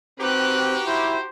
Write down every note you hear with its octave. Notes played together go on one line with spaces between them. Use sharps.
C4 D#4 F#4 G4 B4 F#6
E4 C5